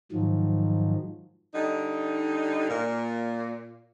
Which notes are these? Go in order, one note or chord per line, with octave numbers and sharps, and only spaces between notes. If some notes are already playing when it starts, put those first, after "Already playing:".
G#2 D#3 F3 F#3
D3 G3 D#4
A#2